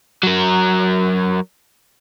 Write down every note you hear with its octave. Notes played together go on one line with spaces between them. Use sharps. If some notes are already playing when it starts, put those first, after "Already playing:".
F#3 A#4